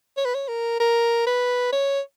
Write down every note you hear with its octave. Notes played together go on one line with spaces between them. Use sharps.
C#5
B4
C#5
A#4
A#4
B4
C#5